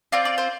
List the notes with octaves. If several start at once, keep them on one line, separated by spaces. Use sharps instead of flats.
C4 F4 D5
D5
C5